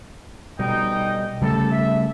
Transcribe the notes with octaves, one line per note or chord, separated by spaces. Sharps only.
B2 G3 D#4 G5
C#3 G3 A3 A4
E5